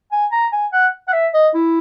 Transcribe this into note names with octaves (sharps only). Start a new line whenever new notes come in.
G#5
A#5
G#5
F#5
F#5
E5
D#5
E4